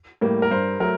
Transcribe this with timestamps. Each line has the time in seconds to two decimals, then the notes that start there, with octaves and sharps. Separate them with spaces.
0.21 A2 G3 A#3
0.42 A#4
0.51 G2 C5
0.80 F#3 A3 A#4